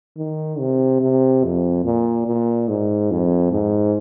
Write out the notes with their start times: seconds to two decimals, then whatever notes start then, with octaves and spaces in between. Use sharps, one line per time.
0.18 D#3
0.59 C3
1.01 C3
1.44 F2
1.85 A#2
2.26 A#2
2.68 G#2
3.11 F2
3.52 G#2